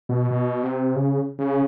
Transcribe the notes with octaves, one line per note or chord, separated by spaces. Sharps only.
B2
B2
C3
C#3
C#3